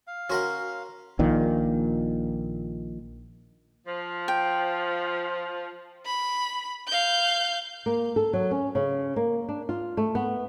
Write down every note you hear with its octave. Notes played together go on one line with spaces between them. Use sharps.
F5
C#4 F#4 A#4 F#5 C6
A#1 A#2 D#3
F3
G5
B5
F5 G6
A#3
A4
F#3
C#4
C#3
A#3
D4
F4
A3
B3